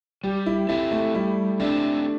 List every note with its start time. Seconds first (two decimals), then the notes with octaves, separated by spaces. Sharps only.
0.24 G3 G4
0.46 E4
0.69 C4 E4 A4 E5
0.92 A3
1.15 G3 E4
1.60 C4 D4 A4 E5